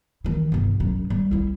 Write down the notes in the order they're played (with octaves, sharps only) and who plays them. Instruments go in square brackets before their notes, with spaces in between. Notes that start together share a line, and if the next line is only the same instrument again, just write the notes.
[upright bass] D#3 E3
G1 C3
F#2
G3
C4 E4